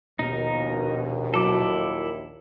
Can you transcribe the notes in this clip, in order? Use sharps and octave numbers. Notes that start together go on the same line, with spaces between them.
A#1 D#2 B2 D#4 A#4
F#3 E4 A4 D6